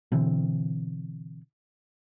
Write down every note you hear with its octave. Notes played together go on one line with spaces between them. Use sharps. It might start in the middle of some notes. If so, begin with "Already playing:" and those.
B2 D3 E3 C4